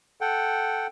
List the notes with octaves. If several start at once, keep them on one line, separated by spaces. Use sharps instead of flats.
A4 F#5 G5